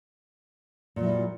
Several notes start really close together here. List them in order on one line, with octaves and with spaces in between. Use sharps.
A#2 F#3 E4 G3